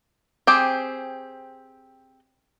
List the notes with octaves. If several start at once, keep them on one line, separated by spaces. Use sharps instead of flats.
C4 G4 G#4